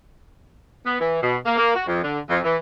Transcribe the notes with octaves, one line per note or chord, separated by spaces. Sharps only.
B3
E3
B2
A#3
A#3
F#4
F2
D3
F2
E3